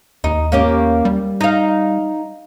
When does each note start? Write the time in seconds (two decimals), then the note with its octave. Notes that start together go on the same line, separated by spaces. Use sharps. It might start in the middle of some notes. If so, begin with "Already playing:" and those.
0.24 D#2 D#4
0.52 A#3 C#4 G4
1.05 G3
1.41 D#4 F5